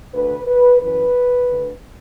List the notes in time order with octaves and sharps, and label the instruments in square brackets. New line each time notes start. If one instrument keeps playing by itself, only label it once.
[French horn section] D2 D3 B4
B4
F#2 E3 B4
D2 D3